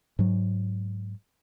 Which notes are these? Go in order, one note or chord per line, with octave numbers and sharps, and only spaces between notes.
G#2 F#3